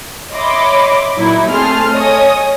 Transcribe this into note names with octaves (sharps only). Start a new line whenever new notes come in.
C#5 D#5 E5 B5 C6 D6
A#2 F#3 D#4 E4
A3 C4 G#4 A5 C6 F6
C#5 D#5 G#5 D#6